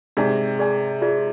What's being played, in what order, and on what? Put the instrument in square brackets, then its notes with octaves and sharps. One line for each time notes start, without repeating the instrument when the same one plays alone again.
[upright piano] G#2 C3 [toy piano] G#4 D5 G#5
[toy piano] G#4 D5 G#5
F4 G#4 D5